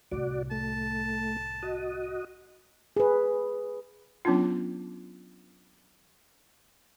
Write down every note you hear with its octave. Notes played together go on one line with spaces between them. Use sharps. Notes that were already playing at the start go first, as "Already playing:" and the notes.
C2 A2 F#4 D5
A3 A5
F#4 D#5
G#4 B4
F#3 B3 C#4 D4 F4